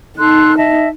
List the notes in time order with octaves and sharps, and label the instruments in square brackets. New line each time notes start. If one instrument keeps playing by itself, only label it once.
[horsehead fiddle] D#4 [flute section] A4 C6 F#6
[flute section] D#5 E5 A5